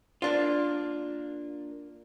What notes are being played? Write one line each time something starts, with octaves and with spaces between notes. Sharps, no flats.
A#3 D4 F4